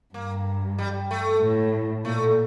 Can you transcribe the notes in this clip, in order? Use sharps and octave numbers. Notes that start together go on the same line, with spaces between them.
G2 A#3
G3
A3
A2
A#2 A3